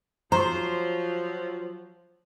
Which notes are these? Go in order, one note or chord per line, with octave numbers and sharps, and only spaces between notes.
F3 F#3 C5 A#5 C#6